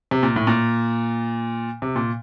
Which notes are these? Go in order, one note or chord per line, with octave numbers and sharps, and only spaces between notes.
C3
A#2
A2
A#2
C3
A#2